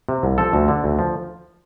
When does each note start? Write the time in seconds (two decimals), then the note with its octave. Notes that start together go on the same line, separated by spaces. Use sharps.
0.09 C3
0.23 C2
0.38 F3 A4
0.53 D2
0.68 D3
0.84 D2
0.99 F3